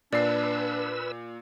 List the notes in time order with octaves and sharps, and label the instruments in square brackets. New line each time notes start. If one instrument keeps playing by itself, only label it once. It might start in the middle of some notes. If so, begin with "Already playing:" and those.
[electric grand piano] A#2 C7 [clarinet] D4 [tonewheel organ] B4 E6 [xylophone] D5